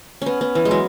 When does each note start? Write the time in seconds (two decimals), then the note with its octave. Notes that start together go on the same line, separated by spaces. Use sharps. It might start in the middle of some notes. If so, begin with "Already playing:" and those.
0.22 B3 C#4
0.41 B3
0.55 E3
0.65 G#3
0.71 F#3